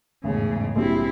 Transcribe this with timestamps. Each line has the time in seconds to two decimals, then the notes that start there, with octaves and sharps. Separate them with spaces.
0.24 E1 A1 G#2 C#3
0.76 A#1 G3 C4 E4 F#4